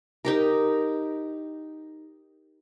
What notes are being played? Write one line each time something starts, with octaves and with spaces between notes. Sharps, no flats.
D#4 G4 A#4